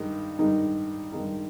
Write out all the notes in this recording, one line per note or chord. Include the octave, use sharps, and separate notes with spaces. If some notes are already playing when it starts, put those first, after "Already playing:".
Already playing: G2 D#3 G#3 D#4
G2 D#3 G#3 D#4
G2 D#3 G#3 D#4